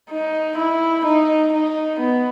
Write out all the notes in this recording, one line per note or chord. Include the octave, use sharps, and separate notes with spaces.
D#4
E4
D#4
D#4
B3